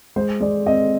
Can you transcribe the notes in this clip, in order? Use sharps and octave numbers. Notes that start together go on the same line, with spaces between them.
G#3 C5
G#3 D5
C4 D#5